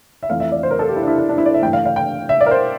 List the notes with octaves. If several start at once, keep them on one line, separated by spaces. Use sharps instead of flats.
E5
F2 E3 A3 F5
E5
D5
C5
A#4
A4
G4
E4
D4
E4
D4
D4
E4
D5
E5
G2 E3 A3 G5
F5
F5
G5
E5
D5
A#4
C5